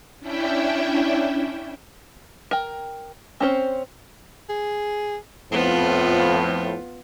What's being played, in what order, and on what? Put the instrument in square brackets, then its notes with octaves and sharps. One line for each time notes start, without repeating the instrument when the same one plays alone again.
[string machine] C#4 D4 E4 E5 G5
[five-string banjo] A#4 G5
C4 C#4 C5
[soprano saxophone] G#4
[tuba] F2 [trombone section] A2 F3 [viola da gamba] B3 F4 [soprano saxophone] C4